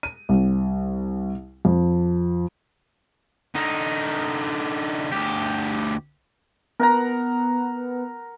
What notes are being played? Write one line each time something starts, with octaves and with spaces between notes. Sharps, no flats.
D#7
C2
F2
D3 D#4
D2 G4
B3 A#4 F#5 A#5